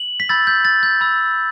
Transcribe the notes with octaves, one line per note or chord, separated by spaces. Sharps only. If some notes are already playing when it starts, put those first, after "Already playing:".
Already playing: F#7
B6
B5 E6 G6 A6
G6
A6
G6
B5 E6 G6